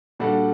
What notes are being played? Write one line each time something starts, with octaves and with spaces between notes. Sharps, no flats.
A#2 G3 D4 F#4 A4